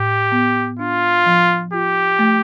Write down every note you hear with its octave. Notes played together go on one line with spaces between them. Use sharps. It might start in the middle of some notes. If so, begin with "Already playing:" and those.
Already playing: A2 G4
B3
D4 F4
F3
F4 G4
A3